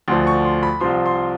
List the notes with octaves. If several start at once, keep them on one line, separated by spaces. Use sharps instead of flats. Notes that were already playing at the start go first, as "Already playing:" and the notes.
D2 D3 F3 C6
C#6
C6
B5
C2 C3 F3 C6
C6